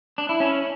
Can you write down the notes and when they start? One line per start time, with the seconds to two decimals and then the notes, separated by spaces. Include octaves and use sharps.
0.18 D4
0.29 E4
0.40 C#4